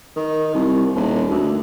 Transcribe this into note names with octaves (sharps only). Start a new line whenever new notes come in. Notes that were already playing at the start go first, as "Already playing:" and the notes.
D#3
C2
D#1
D2